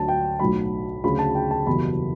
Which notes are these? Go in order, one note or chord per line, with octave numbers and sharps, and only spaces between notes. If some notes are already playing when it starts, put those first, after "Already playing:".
Already playing: D2 D3 F#3 A5
G5
B1 A2 F#3 B5
D2 C#3 F#3 B5
A5
G5
A5
F#1 E2 B2 G3 B5